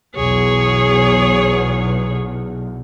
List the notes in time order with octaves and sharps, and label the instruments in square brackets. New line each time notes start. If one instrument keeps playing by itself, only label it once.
[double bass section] B1 E2 [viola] G#4 C#5